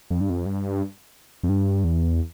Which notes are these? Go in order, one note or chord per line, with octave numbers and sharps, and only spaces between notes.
F2
G2
F2
G2
F2
G2
E2